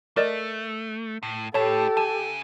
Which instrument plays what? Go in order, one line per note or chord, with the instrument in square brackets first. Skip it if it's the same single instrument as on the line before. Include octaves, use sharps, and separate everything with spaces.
[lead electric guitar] A3 [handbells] A#4 D5 D#5
[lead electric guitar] A2
[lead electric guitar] A2 [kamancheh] G4 A4 [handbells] C#5 A5
[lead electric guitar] C#3 G#5 [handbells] A5